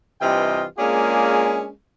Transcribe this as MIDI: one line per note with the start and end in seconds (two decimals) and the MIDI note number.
0.21 0.65 43
0.21 0.65 48
0.21 0.65 52
0.21 0.65 65
0.21 0.65 75
0.21 0.65 79
0.79 1.70 56
0.79 1.70 58
0.79 1.70 61
0.79 1.70 62
0.79 1.70 65
0.79 1.70 68